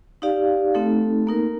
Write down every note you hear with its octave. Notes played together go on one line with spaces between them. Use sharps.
D#4 G4 D5 F5
A3 C4 D#4 A4
A#3 D#4 A#4